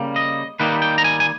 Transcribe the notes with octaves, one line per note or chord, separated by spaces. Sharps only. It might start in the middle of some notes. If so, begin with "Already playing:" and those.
Already playing: C#3 G3 A#3
D#5
D#3 G3 A#3 D#4 B4
G5
A#5
G#5
G#5